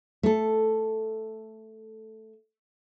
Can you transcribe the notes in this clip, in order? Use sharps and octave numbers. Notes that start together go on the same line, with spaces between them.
A3 A4